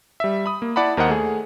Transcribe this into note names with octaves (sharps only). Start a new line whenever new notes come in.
G3 E5
B5 D#6
A#3
E4 D5 F#5 A5 B5
D#2 A#4 C5 D#5 F#5
A3 G#4